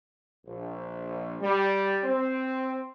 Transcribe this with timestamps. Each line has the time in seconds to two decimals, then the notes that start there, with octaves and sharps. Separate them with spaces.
0.45 A#1
1.40 G3
2.03 C4